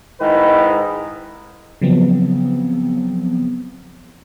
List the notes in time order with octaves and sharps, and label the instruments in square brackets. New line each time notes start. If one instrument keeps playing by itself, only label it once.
[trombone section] G#2 D#3 E4 B4
[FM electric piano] C#3 F3 F#3 B3 C4